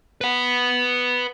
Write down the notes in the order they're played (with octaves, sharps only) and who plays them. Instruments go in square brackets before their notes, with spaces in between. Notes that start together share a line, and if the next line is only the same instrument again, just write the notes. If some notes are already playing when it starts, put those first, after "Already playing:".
[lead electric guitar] B4 F#5